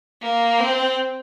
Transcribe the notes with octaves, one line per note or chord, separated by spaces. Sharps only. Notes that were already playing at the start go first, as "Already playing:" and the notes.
A#3
C4